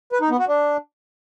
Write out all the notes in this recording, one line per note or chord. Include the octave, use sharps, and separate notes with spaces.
B4
D#4
B3
F#4
D4